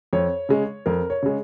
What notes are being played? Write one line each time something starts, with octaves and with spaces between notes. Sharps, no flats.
F2 C#5
C#3 G#3
F2 A#4
C#5
C#3 G#3